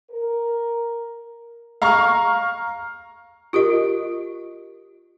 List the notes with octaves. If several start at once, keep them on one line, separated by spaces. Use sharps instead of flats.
A#4
F5 A#5 C#6 F6
F4 G4 A#4 D#5